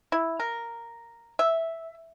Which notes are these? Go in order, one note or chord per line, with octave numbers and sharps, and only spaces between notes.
E4
A#4
E5